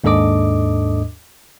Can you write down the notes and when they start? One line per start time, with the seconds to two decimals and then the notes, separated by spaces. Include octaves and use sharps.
0.04 D#2 G#2 D4 A4 D#5 D6